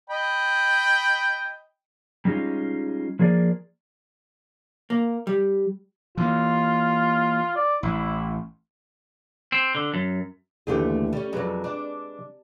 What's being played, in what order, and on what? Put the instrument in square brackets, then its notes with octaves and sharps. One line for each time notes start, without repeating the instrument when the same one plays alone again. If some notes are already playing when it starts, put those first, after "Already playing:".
[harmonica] D#5 G5 B5
[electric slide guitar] G3 G#3 C#4 D#4 F4
F3 A#3 G#4 A#4 D5
[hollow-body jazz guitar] A#3
G3
[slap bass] E3 A#3 [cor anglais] F4
[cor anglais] D5
[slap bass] A1 [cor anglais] E4
[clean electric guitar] C4
D3
F#2
[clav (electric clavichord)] D#2 D3 E3 [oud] A3 G4 G#4
[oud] G3 C#4
[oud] F2 F#3 [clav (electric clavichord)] G#3 B4 D5
[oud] D4